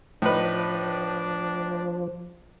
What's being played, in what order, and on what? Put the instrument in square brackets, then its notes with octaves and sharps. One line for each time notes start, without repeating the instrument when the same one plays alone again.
[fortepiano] A2 D#4 B4 [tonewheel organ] F3 [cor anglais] D4